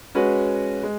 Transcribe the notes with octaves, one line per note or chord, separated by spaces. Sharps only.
G#3 C#4 F#4 B4
G#3